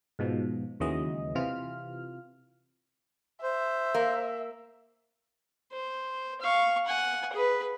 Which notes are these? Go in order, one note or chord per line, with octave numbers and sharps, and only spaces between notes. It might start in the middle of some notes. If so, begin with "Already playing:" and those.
G#2 B2 F3
D#2 C#3 E3 F#3 G#3 D#5
C3 E3 F4 F6
C5 E5
A#3
C5
F5 C#6
F#5 G#5
G#4 B4